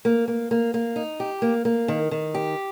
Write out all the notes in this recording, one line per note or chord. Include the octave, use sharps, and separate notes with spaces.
A#3
A#3
A#3
A#3
D#4
G4
A#3
A#3
D#3
D#3
G4